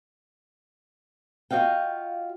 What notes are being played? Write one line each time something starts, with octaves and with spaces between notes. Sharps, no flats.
F4 F#4 D#5 F5 G5